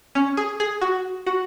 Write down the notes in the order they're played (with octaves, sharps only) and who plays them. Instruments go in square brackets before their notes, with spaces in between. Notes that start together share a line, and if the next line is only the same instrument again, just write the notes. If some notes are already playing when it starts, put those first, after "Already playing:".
[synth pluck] C#4
G#4
G#4
F#4
F#4